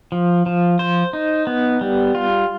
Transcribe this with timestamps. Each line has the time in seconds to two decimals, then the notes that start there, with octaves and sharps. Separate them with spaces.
0.12 F3
0.46 F3
0.79 C5
1.13 D#4
1.47 B3
1.81 G3
2.15 F4